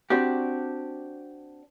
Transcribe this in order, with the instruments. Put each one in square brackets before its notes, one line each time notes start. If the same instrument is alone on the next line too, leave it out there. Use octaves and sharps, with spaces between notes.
[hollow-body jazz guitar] C4 D4 F#4 G4